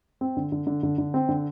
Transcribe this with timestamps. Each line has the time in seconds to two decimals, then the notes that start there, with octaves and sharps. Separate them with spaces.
0.21 C4
0.37 D3
0.52 D3
0.67 D3
0.83 D3
0.98 D3
1.14 C4
1.29 D3